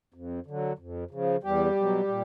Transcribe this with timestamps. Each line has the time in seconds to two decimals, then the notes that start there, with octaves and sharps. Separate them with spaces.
0.14 F2
0.46 D3 F#3
0.79 F2
1.11 C#3 F3
1.43 E2 G3 G4
1.75 B2 F#3
2.08 A#2